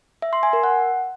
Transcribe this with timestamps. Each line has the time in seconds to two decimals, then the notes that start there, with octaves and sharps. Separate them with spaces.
0.22 E5
0.33 C6
0.43 G#5
0.53 A#4
0.64 F#5